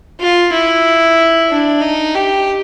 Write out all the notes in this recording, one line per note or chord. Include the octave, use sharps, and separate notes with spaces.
F4
E4
D4
D#4
G4